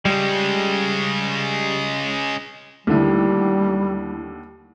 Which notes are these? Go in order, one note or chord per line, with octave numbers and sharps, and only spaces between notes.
C#3 G3 G#3
D#2 D3 G3 A3 E4